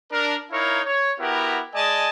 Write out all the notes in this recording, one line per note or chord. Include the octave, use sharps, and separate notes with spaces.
D4 A#4
D#4 E4 A#4 C#5 F5
C#5
B3 E4 F#4 G4 A#4
G#3 D5 D#5 G#5 A5